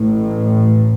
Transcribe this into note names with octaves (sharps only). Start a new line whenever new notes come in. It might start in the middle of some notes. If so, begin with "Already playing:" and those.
Already playing: A1 A2